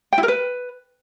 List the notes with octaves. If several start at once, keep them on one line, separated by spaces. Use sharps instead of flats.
G5
E4
A#4
B4